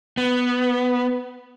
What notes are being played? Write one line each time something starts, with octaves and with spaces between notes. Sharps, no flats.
B3